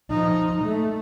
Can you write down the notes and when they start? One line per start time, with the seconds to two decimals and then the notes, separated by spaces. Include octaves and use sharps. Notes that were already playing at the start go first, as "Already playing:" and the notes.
0.10 F3 D#4
0.63 A3